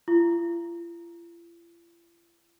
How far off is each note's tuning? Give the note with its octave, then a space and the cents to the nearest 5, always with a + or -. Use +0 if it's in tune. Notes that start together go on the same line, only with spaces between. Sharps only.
F4 -45